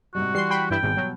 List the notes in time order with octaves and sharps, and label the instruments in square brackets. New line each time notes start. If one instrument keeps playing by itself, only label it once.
[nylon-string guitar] G#2 C3 G3 [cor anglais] F#4
[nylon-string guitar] E3 [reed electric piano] G3 [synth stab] C6 C7
[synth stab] G5 B5 C6
[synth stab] G2 E4 [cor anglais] G5
[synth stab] G#1 G#2 [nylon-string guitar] B2
[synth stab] F#3